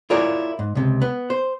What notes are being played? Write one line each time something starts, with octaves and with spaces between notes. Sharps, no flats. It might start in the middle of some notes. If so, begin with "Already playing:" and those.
E4 F4 G#4 A#4 C#5 D5
G#2
C#2 C3
B3
C5